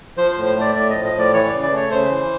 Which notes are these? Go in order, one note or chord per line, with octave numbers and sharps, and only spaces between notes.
F3 C5
C5
A2
C5
A3 D5
A2 D5
F3 D#5
D#5
A2
D5
E3 C#5
C#5
C#3 D5
D5
A3 C#5
C#3 C5
E3